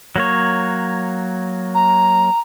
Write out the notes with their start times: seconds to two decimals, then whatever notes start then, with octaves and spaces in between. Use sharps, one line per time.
0.16 F#3 A#3 C#5
1.74 A#5